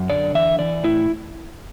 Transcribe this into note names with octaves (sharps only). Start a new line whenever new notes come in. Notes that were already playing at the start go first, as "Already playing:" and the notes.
Already playing: F#2
D3 D5
E3 E5
E3 D5
A2 E4